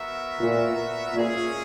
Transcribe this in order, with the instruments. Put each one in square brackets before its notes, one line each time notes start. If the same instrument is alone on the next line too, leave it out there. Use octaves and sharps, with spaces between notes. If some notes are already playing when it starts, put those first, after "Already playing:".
Already playing: [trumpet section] B3 F#4 A#4 E5
[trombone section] A#2
[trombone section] A#2 [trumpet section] G#3 C#4 G#4